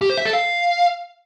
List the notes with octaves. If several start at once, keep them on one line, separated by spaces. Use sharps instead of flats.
G4
C5
E5
A4
F5